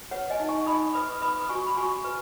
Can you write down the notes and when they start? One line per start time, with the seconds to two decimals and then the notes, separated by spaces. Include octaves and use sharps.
0.11 B4 C#5 F#5
0.30 D#5 G#5
0.40 D#4
0.49 G#5 C#6
0.66 D#4 B5 D#6
0.94 B4 B5 D#6
1.22 B4 B5 D#6
1.42 D#6
1.49 F#4 G#5 C#6
1.67 B5
1.77 F#4 G#5 C#6
2.04 B4